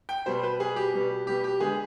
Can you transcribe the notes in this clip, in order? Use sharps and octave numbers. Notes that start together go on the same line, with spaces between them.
G5
B2 G3 B3 C5
B4
B2 G3 B3 G#4
G4
B2 G3 B3
B2 G3 B3 G4
G4
D3 G#3 B3 G#4